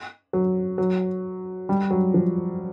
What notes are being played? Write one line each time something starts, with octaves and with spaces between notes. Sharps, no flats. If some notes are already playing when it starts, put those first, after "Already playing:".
F#3
F#3
G3
F#3
F3